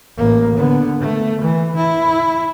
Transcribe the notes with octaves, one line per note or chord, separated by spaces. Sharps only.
A1 A#3
D3 B3
A3
E3
E4